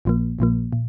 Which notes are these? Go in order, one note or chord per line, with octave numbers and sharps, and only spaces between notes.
A#1 A#2 F3 A#3
A#1 A#2 F3 A#3
A#2